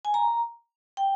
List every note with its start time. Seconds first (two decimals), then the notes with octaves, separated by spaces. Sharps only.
0.05 G#5
0.14 A#5
0.97 G5